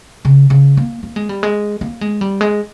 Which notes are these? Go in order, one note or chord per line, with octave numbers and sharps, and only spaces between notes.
C#3
C#3
A#3
A#3
G#3
G3
G#3
A#3
G#3
G3
G#3